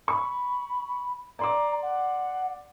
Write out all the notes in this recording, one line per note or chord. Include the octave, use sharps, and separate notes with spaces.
B5 C#6
D5 A#5 C6 D6
F#5